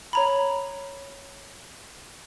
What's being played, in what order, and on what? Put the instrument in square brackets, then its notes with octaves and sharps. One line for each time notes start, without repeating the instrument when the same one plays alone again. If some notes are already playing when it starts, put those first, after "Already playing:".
[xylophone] C#5 A#5 B5